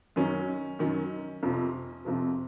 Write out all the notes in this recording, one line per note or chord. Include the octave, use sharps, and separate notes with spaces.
F#2 D#3 F#3 C#4
F#2 D#3 F#3
F2 C3 F3
F2 C3 F3